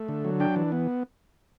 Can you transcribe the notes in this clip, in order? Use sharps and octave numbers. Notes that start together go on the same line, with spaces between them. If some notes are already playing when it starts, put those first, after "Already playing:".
Already playing: A3
D3
F#3
D4 G5
E3
B3